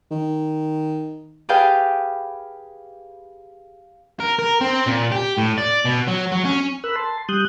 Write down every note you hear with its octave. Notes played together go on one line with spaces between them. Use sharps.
D#3
G4 G#4 B4 F5 G5 A5
A#4
A#4
C4
A#2
G4
A2
D5
B2
F#3
F#3
C#4
A#4 B5 E6 F#6
A5 C6
G3 D#6 F#6 G6